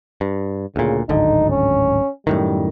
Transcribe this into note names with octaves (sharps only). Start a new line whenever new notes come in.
G2
D2 A#2 C#3
D1 G#1 D3 D#4
C#4
F#2 A2 D#3 G3